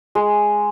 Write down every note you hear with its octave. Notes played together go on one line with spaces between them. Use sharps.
G#3